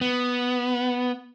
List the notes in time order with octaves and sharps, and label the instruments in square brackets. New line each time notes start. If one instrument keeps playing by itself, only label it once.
[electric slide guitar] B3